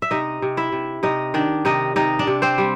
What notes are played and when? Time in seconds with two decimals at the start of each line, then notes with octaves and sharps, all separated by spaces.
0.02 E5
0.11 C3 D#4 D#5
0.42 C3
0.57 E4 E5
0.72 C3
1.03 C3 D#4 D#5
1.34 D#3 D4 D5
1.65 C3 D#4 D#5
1.96 C3 D#4 D#5
2.19 D4 D5
2.27 C3
2.42 C4 C5
2.58 G3